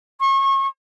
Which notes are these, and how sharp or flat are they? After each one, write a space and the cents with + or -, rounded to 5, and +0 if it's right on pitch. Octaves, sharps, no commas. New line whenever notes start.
C#6 -35